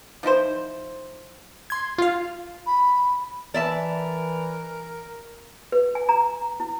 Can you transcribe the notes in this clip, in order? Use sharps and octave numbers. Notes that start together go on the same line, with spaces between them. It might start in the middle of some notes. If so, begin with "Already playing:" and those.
F3 D#4 E4 C5
C6 G#6
F4 F5
B5
E3 A#4 D5 E5 A5
B4
G#5
A#5
E4